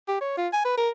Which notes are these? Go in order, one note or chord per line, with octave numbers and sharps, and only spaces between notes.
G4
C#5
F4
G#5
B4
A#4